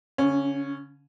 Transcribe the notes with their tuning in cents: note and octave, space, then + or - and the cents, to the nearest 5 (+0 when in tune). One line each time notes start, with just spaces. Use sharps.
D3 -45 C#4 +0